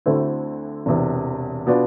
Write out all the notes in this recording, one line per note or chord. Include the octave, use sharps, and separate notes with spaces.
D2 D3 A3 C4 E4
E1 E2 C3
B2 B3 D4 F4